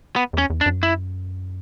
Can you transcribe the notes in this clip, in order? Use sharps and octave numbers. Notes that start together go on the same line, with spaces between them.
B3
E2 C#4
E2
D4
F#2
E4